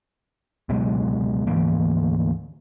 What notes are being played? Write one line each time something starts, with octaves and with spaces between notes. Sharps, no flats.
C#2 B2 F#3 G#3
D2 G#2 E3 A#3